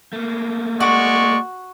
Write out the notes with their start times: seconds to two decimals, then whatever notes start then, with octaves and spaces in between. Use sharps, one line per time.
0.13 A3 A#3
0.80 G#3 F#4 D5 C#6